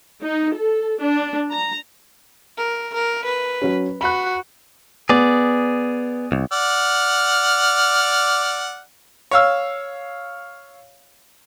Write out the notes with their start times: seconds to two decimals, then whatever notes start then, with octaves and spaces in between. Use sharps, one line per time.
0.22 D#4
0.54 A4
0.99 D4
1.50 A#5
2.58 A#4
2.94 A#4
3.25 B4
3.62 F#3 C#4
4.01 F#4 B5 F#6
5.09 B3 G#4 D5
6.32 C2
6.52 D5 F#5 F6
9.31 C#5 F5 E6